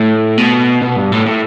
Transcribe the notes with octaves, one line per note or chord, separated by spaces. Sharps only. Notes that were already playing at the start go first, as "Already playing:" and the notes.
Already playing: A2
B2
B2
G2
A2
A2